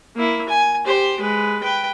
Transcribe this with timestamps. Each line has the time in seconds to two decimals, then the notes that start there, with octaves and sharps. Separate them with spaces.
0.16 A#3 E4
0.49 G#5
0.85 G4 C5
1.20 G#3 B4
1.63 B4 G5